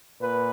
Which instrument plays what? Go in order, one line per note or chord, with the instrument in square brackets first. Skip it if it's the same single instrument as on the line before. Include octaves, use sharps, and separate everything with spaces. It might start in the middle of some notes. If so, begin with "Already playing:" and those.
[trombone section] A#2 B4